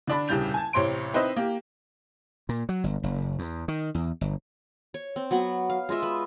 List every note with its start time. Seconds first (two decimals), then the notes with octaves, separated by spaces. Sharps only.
0.07 D3 D4 B5
0.28 D#1 C2 C#3 G3 G6 F7
0.54 G#5 A5
0.73 A1 C3 C#5 C6 D7
1.14 C4 D#4 B4 C5 D#5 E5
1.36 A#3 G4
2.49 A#2
2.69 F#3
2.84 G1
3.03 F#1
3.39 E2
3.68 D#3
3.95 E2
4.21 G1
4.94 C#5
5.16 C4
5.31 F#3 B3 F#4
5.70 F5
5.89 G#3 F4 D#5 E5
6.03 B4